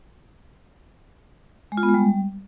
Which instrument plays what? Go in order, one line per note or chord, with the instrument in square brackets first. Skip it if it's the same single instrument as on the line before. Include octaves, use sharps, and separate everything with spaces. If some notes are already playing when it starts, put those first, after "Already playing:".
[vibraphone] G#3
F4
B3
G#3
G3